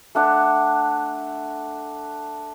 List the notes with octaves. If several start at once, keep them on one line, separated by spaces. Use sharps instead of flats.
A3 D4 F#5